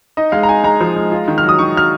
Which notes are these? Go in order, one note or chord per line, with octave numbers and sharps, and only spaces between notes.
D#4 D#5
G#3 F5
A#5
D#4 G#5
G#3 A#5
F3
G#3
F4
D#3
F6
F#3
D#6
D#3 C#6
F#3 F6